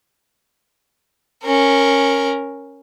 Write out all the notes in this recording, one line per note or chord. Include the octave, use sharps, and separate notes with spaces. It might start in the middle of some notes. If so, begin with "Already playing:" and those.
C#4 A#4